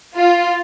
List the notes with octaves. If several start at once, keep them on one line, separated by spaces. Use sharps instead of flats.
F4